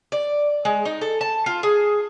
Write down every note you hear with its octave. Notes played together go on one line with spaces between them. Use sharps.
D5
G#3
D#4
A4
A5
F4
G#4